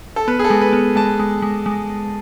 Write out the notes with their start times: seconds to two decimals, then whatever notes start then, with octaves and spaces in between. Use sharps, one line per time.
0.16 A4
0.28 B3 B4
0.39 G#4
0.44 A4
0.50 G#3
0.61 B4
0.73 B3
0.96 G#3 A5
1.20 G#3
1.42 G#3
1.66 G#3